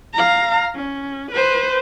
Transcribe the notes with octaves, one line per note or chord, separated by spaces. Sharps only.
F5 A#5
C#4
B4 C5